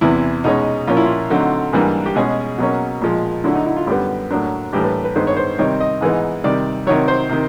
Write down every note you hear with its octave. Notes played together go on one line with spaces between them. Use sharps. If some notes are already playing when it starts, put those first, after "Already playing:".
E2 C3 E3 E4
B2 G#3 C#4 D#4
A#2 F3 A#3 C#4 F4
E4
F4
D3 F#3 A3 C4 D#4
G#2 E3 G3 A#3 D4
G4
B2 G#3 C#4 G#4
B2 F#3 A#3 C#4
A#2 F3 G#3
D3 F#3 A3 D4 E4
D#4
E4
F4
F#2 D3 G3 B3 G4
A2 F#3 A#3 D4
A2 E3 G3 A#3 D4 G4
B4
B4
G2 D#3 G#3 B3 D#4 C5
C#5
C5
C3 D#3 G3 C4 D#4 C#5
D#5
G#2 E3 G#3 B3 D#4
C3 D#3 G3 D5
C3 D#3 F#3 C#5
C5
C3 D#3